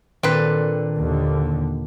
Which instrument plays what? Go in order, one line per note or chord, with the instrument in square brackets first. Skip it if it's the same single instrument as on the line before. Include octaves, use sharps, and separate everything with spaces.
[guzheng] A#2 D4 A4 [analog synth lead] D#3 [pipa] C4 B4
[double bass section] D#2 D3